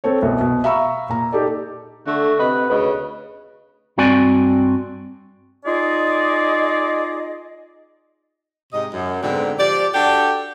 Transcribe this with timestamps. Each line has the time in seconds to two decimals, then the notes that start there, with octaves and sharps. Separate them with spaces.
0.04 C4 A4 C#5
0.22 C2 B2
0.41 B2
0.64 E5 F5 A#5 B5 C#6 E6
1.09 A#2 A#5
1.32 D#4 G4 A4 D5
2.07 D3 A3 F#4
2.39 C3 B4 D#5 F#5
2.70 D2 C#3 B4 D#5
3.98 G2 C4 F#4 D5 G#5
5.66 D#4 F4 G#4 D5 D#5
8.73 G#2 C3 D#5
8.93 F#2
9.22 G#2 B2 D3 C4 D4
9.59 F3 G4 D5
9.94 D4 F#4 G4 A4